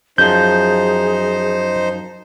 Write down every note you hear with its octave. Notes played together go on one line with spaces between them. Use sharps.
F#2 F3 D#4 G#4 C5 G6